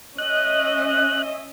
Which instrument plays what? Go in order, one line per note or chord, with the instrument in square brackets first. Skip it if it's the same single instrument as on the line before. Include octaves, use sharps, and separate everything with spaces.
[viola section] C#4 D#5 E5 [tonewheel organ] F#6